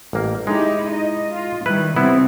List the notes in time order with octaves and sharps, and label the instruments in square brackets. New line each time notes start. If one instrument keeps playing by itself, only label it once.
[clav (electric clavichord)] A1 A#3
[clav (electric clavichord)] G#3 [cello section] D#4 E4 G4
[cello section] D#4 D#5
F4
[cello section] D#3 G3 [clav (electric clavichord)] E4 B4
[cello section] C3 G3 C4 [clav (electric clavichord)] B3 E4